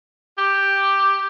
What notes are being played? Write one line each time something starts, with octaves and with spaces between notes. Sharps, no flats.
G4